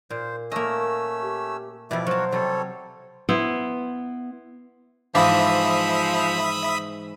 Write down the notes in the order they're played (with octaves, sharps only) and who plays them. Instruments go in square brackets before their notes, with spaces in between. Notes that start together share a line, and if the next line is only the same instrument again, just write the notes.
[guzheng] A#2 [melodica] C5
[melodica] A3 C#4 E6 [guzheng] A#3 D#5
[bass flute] G4
[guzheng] B2 F3 [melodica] G3 E4 D6 [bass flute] E5
[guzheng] F#3 A5 [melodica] F#4 A#4 C#5 [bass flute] C5
[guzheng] C3 F#3 [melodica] G3 A4 C#5
[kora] B3 E4 C5
[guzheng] G#2 E3 [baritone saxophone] F3 [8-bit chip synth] E5 B5 D#6 [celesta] F5 D6